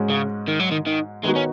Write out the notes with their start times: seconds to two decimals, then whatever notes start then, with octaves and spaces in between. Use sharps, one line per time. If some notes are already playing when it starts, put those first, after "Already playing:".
Already playing: G#2 G#3 C#4 F#4
0.10 C#3
0.48 D#3
0.60 F#3
0.71 D#3
0.86 D#3
1.23 D#3 G#3 B3 D#4 F#4
1.35 C#4